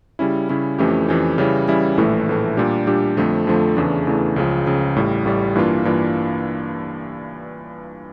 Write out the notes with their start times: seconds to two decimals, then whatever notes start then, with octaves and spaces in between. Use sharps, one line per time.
0.19 C#3 G3 C#4 E4
0.49 C#3 G3 C#4 E4
0.79 F2 E3 A3 C#4 G4
1.08 F2 E3 A3 C#4 G4
1.38 C#3 E3 G3 C#4 E4
1.68 C#3 E3 G3 C#4 E4
1.97 A#1 A2 E3 A3
2.27 A#1 A2 E3 A3
2.57 A#2 G3 D4 G4
2.87 A#2 G3 D4 G4
3.17 F2 D3 F3 A3
3.47 F2 D3 F3 A3
3.77 E2 C#3 E3 A3 D4
4.07 E2 C#3 E3 A3 D4
4.36 C#2 C#3 F3
4.66 C#2 C#3 F3
4.96 A1 A2 G3
5.25 A1 A2 G3
5.55 G2 E3 A#3 D4 F4
5.85 G2 E3 A#3 D4 F4